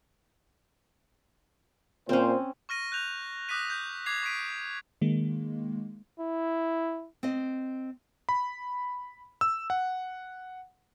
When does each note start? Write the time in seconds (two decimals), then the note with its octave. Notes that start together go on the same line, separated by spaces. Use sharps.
2.09 A#2 C4 C#4 C5
2.69 C#6 F6 A#6 D#7
2.92 F#6 G6 F7
3.49 D6 D#6 F#6 A#6 B6 D#7
3.70 G6
4.06 D6 G#6 C7 F7
4.23 C#6 B6 C7 D7 D#7
5.01 D#3 G#3 A#3
6.19 E4
7.23 C4 D#5
8.29 B5
9.41 E6
9.70 F#5